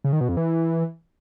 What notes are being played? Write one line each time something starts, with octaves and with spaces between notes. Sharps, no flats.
C#3
D#3
B2
F2
E3